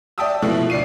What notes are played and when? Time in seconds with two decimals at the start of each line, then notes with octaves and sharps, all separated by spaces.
0.18 D5 E5 G5 A5 D#6 E6
0.42 B2 F3 A3 E4 F4
0.70 D2 D5 C7 D#7